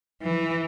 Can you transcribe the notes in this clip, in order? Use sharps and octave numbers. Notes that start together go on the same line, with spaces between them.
E3